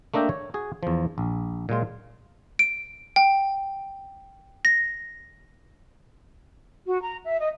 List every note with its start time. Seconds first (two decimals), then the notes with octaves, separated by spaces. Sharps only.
0.14 A3 A#3 D4 D#5 E5 G5
0.29 C#5
0.54 F#4 G#4
0.83 E2 F3
1.18 A#1
1.69 A#2 F#3 G#3 F4
2.59 D7
3.16 G5
4.65 A#6
6.86 F#4
7.03 A#5
7.25 E5
7.40 D#5